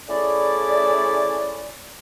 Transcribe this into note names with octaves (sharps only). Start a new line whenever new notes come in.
A3 C#4 E4 G#4 D5